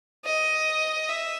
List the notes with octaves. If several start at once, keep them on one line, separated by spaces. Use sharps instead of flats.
D#5
E5